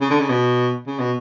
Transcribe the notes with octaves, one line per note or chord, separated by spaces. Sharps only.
C#3
D3
C#3
B2
C#3
B2